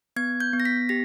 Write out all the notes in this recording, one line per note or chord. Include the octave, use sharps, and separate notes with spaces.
B3 G#6
G6
B3
A#6
B6
G4 A#6